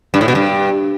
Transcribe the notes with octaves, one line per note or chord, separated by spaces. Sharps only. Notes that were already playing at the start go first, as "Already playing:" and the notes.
G2
A2
B2
G2